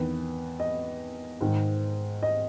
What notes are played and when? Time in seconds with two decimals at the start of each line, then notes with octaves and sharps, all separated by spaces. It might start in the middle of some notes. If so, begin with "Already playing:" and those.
Already playing: E2 D#3 B4
0.60 D#5
1.41 G#2 D#3
2.23 D#5